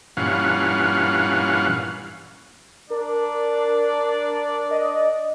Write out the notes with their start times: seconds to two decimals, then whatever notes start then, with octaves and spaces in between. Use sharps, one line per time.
0.17 G2 A#2 E3 C#4 F5 F#5
2.90 D4 A#4 D5
4.71 D#5